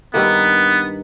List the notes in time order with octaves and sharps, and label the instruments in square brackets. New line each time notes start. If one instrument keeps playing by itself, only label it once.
[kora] G2 D#3 A#3 [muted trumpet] B3